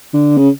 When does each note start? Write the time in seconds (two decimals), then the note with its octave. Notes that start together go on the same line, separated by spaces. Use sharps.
0.13 D3
0.37 C#3